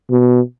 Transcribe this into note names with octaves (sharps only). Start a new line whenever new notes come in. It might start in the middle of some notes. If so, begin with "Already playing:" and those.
B2